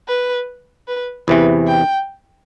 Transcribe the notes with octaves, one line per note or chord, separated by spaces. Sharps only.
B4
B4
E2 C3 E3 B4
G5